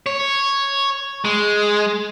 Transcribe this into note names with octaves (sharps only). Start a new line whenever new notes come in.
C#5
G#3